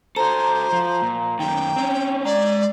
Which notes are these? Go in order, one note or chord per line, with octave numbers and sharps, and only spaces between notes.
F#4 A4 C5 A#5
F3
A#2
F#2 D#3 G5
C4 C#4
G#3 D5 A#5